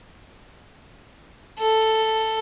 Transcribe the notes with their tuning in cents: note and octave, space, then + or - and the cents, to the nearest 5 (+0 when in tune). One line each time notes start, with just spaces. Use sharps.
A4 +5